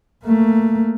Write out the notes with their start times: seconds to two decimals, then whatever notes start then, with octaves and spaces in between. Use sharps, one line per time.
0.25 A3 A#3